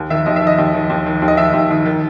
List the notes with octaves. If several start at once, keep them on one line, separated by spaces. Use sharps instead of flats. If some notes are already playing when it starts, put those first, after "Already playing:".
Already playing: D#2
D#3 E5
D#2 D#5
E5
D#3
D#5
D#2
D#3
D#2
D#3
D#2
D#5
D#3 E5
D#2
D#3
D#3